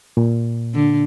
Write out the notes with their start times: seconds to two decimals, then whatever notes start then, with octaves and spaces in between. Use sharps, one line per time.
0.17 A#2
0.74 D3